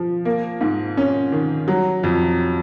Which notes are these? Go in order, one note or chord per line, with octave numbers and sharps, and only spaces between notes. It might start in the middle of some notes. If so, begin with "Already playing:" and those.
Already playing: F3
A#3
G#2
C#4
D#3
F#3
F2